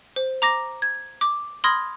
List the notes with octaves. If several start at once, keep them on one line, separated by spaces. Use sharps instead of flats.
C5
A#5 D6 A#6
G#6
D6
B5 C6 D#6 F6 G#6 A#6